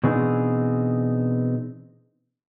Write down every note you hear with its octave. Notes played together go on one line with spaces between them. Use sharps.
B2 E3 C4 D4 D#4 G#4